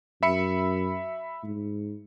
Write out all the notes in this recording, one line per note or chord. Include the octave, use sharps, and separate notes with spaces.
F#2 E5 B5 C#7
G#2